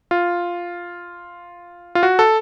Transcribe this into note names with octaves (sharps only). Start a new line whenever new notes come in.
F4
F4
F#4
A4